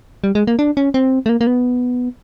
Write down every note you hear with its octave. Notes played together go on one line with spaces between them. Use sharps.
G3
G#3
A#3
D4
C#4
C4
A3
A#3
A#3
B3